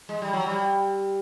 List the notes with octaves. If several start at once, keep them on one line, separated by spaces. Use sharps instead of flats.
G#3
G3
F#3
G3